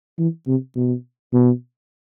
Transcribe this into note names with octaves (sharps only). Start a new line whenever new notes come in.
E3
C3
B2
B2